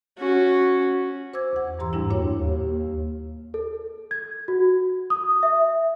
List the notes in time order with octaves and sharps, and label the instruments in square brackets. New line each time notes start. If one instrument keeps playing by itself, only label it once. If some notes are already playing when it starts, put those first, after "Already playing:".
[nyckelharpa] C#4 F#4
[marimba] C5 D6 E6 G#6
E2 F#5
G2 E3 G4 A#5 C6 E6
E2 G#2 G3 D4 E4
G2 A#2 A#3 D4 F#4 C#5
[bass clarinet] D#2
[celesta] A4
G#6
F#4
D#6
E5